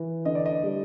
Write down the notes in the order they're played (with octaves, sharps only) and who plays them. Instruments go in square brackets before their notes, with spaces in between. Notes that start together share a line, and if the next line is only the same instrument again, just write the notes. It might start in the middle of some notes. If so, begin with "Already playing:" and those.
Already playing: [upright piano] E3
[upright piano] D3 [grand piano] D#5
[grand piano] D5
D#5
[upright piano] G3